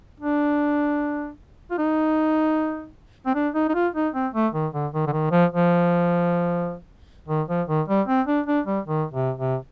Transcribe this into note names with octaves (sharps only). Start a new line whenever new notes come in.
D4
F4
D#4
C4
D4
D#4
D#4
F4
D#4
C4
A3
D#3
D3
D#3
D3
D#3
F3
F3
D#3
F3
D#3
G3
C4
D4
D4
G3
D#3
C3
C3